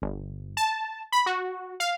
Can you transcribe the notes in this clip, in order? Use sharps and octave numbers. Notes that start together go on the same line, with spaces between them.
G1
A5
B5
F#4
F5